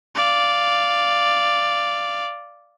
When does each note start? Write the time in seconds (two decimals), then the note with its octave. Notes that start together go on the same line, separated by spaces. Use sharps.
0.15 D5 F5